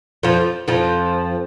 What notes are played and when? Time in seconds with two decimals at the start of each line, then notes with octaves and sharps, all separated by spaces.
0.23 F2 F3
0.68 F2 F3